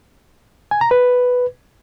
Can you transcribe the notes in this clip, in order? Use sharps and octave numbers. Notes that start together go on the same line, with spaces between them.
G#5
A#5
B4